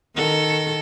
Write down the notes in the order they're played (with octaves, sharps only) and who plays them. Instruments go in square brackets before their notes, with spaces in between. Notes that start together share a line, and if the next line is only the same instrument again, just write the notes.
[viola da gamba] D#3 A4